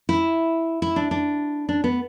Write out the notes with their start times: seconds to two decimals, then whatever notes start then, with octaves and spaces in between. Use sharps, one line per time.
0.09 E4
0.82 E4
0.96 D4
1.11 D4
1.69 D4
1.84 B3